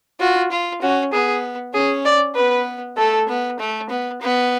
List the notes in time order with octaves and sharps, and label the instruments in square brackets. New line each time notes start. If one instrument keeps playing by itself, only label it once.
[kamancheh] F4 [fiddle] F#4
[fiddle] F4
[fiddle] C#4 [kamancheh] F#4
[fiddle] B3 [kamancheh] G#4
[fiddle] C#4 [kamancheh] G#4
[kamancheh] D5
[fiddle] B3 [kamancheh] B4
[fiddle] A3 [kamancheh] A4
[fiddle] B3
A3
B3
B3